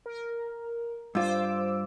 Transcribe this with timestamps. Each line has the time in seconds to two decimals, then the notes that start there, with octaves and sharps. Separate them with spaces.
0.06 A#4
1.15 G2 F4 C5 D6 E6